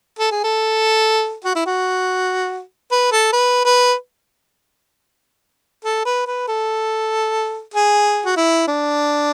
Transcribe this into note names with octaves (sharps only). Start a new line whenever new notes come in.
A4
G#4
A4
F#4
E4
F#4
B4
A4
B4
B4
A4
B4
B4
A4
G#4
F#4
E4
D4